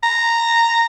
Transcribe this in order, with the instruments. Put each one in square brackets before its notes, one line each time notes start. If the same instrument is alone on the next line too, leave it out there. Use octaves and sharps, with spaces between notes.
[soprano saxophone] A#5